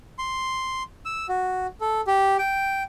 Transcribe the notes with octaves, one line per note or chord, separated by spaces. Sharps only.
C6
E6
F#4
A4
G4
G5